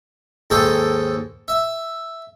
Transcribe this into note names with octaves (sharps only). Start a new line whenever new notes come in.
D#2 G#2 G#4 A4 G5
E5